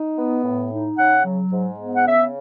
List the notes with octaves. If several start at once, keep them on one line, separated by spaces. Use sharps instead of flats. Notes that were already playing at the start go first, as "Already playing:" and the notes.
Already playing: D#4
B3
A2
D#4
C#3 F#5
F#3
G#2
B3
F#5
C#3 E5